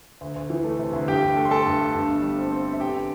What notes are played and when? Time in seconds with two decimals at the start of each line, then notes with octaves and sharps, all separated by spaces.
0.21 D2
0.36 D2
0.50 E3
0.64 A3
0.79 C3
0.93 D2
1.08 G2 G4 G5
1.22 G2
1.36 A3
1.45 C6
1.50 A3 A4 A5
1.66 G2
1.80 A3
1.94 G2
2.08 G1
2.22 G3
2.37 C4
2.51 C4
2.66 C4
2.73 E5
2.80 A1 G4 G5
2.94 D3